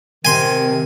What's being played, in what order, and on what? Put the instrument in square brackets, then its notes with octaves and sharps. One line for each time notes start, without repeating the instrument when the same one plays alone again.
[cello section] C3 [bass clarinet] D#3 [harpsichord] G#5 C6